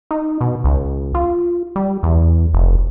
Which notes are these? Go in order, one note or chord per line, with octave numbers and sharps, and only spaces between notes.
D#4
B2
C#2
F4
G3
E2
F1